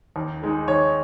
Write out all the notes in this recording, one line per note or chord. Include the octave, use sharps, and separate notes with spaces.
D#2
D#3 G#3 D#4
D#2 C#5